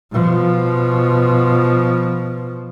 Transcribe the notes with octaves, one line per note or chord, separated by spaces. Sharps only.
B2 F3